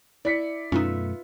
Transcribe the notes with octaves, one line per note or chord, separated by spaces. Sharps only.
E4 D5 B6 C#7
F#2 B2 A3 C#4 D#4 F4 B4 E5